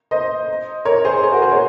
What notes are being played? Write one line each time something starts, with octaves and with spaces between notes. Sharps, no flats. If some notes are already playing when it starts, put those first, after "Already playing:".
C5 D#5
A#4 C#5
G#4 C5
G#4 C5
F#4 A#4
G#4 C5
A#4 C#5